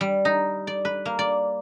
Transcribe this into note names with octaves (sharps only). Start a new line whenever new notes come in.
G3
D#4
D5
B4
A#3
D5